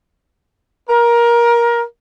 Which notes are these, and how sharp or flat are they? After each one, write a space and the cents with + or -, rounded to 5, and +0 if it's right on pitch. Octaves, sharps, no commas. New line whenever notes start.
A#4 +20